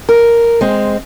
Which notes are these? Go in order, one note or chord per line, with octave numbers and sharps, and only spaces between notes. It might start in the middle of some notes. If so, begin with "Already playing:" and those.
A#4
G#3 C4